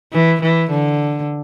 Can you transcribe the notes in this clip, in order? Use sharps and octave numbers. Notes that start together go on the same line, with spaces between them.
E3
E3
D3